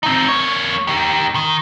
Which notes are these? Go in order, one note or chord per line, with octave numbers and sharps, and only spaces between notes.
C4 D#4
A#3 C#5
D#4 G4
D#3